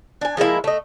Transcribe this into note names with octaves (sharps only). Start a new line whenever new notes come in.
D4 G#5
F3 G#3 A#3 E4
A3 D#5